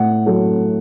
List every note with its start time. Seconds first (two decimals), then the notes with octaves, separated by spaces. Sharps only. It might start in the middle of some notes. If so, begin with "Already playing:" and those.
Already playing: A2 F#5
0.26 F#3 A3